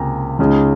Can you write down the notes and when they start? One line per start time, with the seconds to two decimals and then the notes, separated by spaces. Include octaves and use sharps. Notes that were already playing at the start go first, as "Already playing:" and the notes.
Already playing: C#2 C3 A#3 G5 G#5 A#5
0.39 C#2 C#3 G#3 D#4